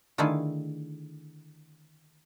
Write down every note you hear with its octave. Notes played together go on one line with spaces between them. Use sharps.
D3 D#3 A3 E4 F4 G#4